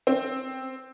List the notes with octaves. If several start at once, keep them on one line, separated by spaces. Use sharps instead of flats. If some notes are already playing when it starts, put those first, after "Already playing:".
C4